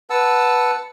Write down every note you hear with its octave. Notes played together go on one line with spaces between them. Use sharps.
B4 F#5 A5 E6